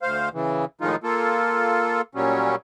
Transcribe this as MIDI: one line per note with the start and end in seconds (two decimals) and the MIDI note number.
0.02 0.29 38
0.02 0.29 72
0.02 0.29 77
0.34 0.65 49
0.34 0.65 52
0.81 0.96 45
0.81 0.96 51
0.81 0.96 53
0.81 0.96 56
0.81 0.96 63
0.81 0.96 65
1.03 2.01 58
1.03 2.01 65
1.03 2.01 69
2.15 2.55 46
2.15 2.55 54
2.15 2.55 55
2.15 2.55 61